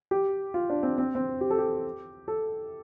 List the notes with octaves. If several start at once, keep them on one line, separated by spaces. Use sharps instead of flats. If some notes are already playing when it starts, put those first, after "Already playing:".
G4
F4
D4
C4
C4
C4
G4
A4
G4
A4